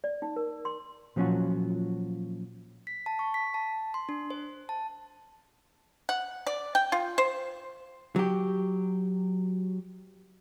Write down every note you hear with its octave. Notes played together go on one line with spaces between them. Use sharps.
D5
D#4
A#4
C6
A#2 F3 F#3 C#4 F4 F#4
B6
A5
C#6
B6
A5
C6
D4
C5
A5
F#5
D5
G5
F4
C5
F#3 G4